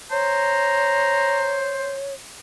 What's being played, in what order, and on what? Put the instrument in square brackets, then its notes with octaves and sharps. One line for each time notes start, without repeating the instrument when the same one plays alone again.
[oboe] C5 [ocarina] C#5 [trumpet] A#5